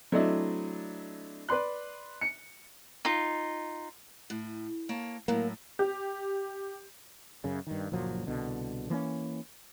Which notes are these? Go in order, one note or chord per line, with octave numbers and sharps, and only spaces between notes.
F#3 A3 C4 D4 E4 D#5
B4 D5 C6 F#6
C#7
D#4 F4
A2
A#3 C#5 A5
A2 F#3 A#3
G4
F#2 C#3
G2 D#3
F#1 A#2 F3 F#3
C2 B2 D3
E3 A#3 C4 C#4